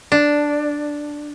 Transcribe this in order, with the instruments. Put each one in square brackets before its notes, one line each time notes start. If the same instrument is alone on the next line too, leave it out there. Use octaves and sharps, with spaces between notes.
[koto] D4